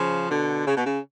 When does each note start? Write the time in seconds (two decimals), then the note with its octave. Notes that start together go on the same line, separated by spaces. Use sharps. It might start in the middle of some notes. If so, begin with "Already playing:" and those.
Already playing: C#3 F3
0.30 B2 D3
0.67 C#3
0.77 B2
0.86 C#3